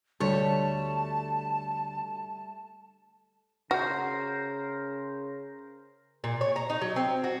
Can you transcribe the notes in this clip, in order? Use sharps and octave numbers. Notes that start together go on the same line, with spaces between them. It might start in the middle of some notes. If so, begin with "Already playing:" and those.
D2 G3 A3 A4 C#5 A5
C#3 F#4 A#4 C5
A#2
C#5
A#5
D#4
F#3
C4
F#4